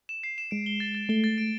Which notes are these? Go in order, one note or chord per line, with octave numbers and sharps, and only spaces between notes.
E7
C7
E7
G#3 D7
G7
A6
A6
A3 G7
A6
D7